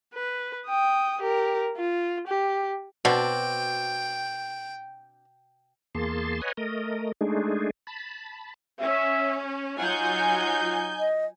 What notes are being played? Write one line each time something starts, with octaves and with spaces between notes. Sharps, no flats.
B4
G5 D#6
G4 A#4
F4
G4
B2 C4 D4 F#4 G5
E2 A#3 G#4 A5 C6
B4 C#5 D#5 F#5 G#5
A3 A#4 D#5
G#3 A3 D4 D#4 G#4
A5 B5
C#4 E5
F#3 D#4 F4 F#5 G#5 G6
D#5